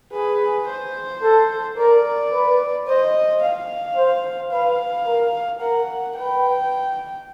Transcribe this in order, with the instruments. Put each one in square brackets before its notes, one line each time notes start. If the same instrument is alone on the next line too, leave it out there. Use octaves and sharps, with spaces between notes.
[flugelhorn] G#4 [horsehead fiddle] B4
[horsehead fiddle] C5
[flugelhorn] A4
[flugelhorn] A#4 [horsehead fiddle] D5
[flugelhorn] B4
[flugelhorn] C5 [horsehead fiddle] D#5
[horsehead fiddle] F5
[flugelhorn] C5
[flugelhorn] B4 [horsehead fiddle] F5
[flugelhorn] A#4
[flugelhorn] A#4 [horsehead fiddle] F#5
[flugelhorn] B4 [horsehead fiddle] G5